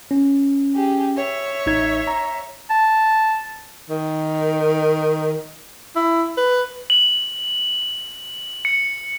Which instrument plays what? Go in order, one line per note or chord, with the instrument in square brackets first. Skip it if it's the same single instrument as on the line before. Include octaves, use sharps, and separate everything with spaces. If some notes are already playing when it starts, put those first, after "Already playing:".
[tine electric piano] C#4
[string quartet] G4 G#4
C#5 E5
[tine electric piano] A1 D#4 G#6
A#5
[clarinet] A5
[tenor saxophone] D#3
E4
B4
[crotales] F#7
C#7